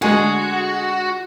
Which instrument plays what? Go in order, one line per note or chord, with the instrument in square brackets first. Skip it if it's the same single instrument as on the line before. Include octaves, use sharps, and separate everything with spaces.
[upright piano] D3 G#3 A3 [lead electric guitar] F#4 [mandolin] G#4